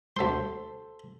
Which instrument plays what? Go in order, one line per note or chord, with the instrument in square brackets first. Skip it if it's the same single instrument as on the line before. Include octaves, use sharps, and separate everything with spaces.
[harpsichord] D2 C6 [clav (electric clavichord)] A4 C5